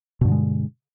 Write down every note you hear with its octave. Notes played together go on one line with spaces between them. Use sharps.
G2 B2 D3 G#3